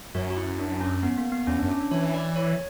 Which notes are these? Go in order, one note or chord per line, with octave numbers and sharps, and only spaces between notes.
F#2 F#4
F#4
E4
D4
C#4
B3
A#3
B3
E2 C#4
D4
F#2
C#4
D4
E3 C#5
D5
C#5